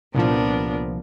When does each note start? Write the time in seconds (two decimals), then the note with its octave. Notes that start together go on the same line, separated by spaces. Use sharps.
0.15 C2 A#2 F3 B3 D4 A#4